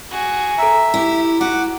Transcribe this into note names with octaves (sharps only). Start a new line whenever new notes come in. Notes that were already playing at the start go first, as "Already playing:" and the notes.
F#4 G#4
A4 E5 A#5
E4 G4
F#4 F#5 D6